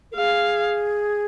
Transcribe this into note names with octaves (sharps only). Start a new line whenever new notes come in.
A#4
G#4 F5